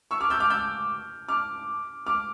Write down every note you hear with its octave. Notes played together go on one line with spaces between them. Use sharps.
C#6 E6
D6 F6
E6 G6
D6 F6
E6 G6
D6 F6
D6 F6